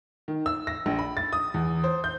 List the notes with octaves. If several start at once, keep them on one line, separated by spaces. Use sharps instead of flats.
D#3
E6
A#6
A#1
B5
A6
D#6
E2
C5
G6